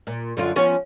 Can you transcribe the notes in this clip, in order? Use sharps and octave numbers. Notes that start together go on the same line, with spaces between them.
A#2
F#2 D3 F4
F3 B3 C#4